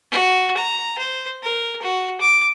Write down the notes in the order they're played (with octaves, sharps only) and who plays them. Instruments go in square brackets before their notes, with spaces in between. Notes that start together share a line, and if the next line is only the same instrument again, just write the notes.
[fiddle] F#4
A#5
C5
A#4
F#4
D6